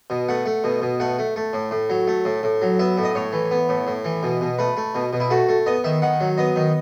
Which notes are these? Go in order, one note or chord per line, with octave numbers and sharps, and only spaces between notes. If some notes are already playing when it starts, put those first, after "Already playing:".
B2
A3 F#5
A3
B2
B2
A3 F#5
A3
A3
A2
A2
F#3
A3
A2
A2
F#3
B3 E5
A2
D#5
A2 C#5
E3
B3
A2
A2
E3
B2
B2
A3 B4
A3
B2
B2
E4
A3 F#4
A3
B3 D#5
D#3 E5
D#3 F#5
F#3
B3 D#5
D#3